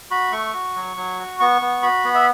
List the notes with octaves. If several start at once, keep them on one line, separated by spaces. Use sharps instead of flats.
F#4 B5
A3 C#6
F#4
F#3
F#3
F#4
B3 C#6
B3
F#4 B5
B3
E5